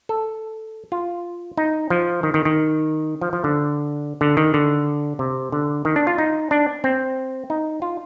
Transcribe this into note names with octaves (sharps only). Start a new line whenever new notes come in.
A4
F4
D#4
F3
D#3
D#3
D#3
F3
F3
D3
D3
D#3
D3
C3
D3
D#3
D4
F4
D#4
D4
C4
D#4
F4